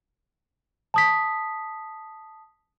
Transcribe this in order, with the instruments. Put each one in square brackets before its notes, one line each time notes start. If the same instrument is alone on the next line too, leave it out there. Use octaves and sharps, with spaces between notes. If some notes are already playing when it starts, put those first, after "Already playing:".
[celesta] A5 D#6 B6